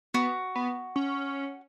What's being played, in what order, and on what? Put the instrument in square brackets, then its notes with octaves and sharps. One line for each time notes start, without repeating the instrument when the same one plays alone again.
[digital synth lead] B3 [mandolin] F#4
[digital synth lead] B3
C#4